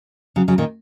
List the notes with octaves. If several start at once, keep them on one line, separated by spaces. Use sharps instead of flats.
C#3 F#3
C#3 F#3
A#2 D#3